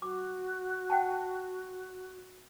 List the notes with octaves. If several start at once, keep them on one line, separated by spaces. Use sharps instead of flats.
F#4 D6
F#5 G5 A5